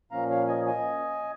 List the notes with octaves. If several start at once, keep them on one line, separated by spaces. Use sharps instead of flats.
A#2 F3 A#3 C#4 F5 A#5
C#5 F5
D#5 G#5
D#5 G#5